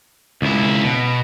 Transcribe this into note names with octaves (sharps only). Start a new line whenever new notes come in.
C#2 E4
B2